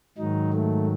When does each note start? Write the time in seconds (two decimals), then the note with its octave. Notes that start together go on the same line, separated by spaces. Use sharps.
0.18 G#2 D#3 F#3 D#4
0.53 A3